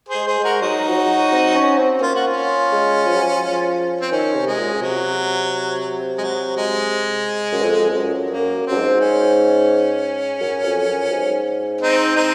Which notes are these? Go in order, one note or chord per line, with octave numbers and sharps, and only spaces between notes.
G#4 C5
G#3
G#4 C5
G#3
F#4 A#4
F#3 D#4 F#4
F3
F#3
C4
C#4
C4
A#3 F4
F#4
C#4 F4
G#3
F3
F#3
F3
C4
D#3 C#4
C3
G#3
A#2
C#3
C3 F#3
G#3
F#3
G#3
F#2
F2
F2
F#2
F#2 A#3
F#2 C4
G#2
C#4
F#2
F2
F#2
G#2
C4 D#4
C4 D#4